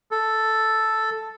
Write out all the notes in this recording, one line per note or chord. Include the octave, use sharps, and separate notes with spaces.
A4